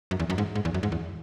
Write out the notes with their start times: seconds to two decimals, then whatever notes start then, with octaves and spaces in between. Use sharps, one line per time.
0.11 F#2
0.20 E2
0.30 F#2
0.38 G#2
0.55 G#2
0.65 E2
0.74 F#2
0.83 G#2
0.92 E2